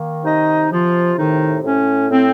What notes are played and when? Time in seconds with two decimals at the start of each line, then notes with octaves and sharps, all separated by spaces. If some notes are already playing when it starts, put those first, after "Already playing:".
Already playing: D#3 A#3
0.24 C3 D#4 D#5
0.71 C3 F3 F4
1.17 A2 D#3 D#4
1.63 A2 C#4
2.09 A2 C4